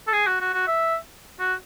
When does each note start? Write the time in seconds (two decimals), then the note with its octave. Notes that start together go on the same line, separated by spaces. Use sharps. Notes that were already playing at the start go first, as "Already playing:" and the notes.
0.07 A4
0.13 G#4
0.27 F#4
0.40 F#4
0.54 F#4
0.67 E5
1.40 F#4